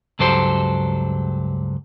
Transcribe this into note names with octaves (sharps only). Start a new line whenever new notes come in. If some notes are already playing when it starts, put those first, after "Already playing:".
C#2 G2 F#3 G4 A4 C5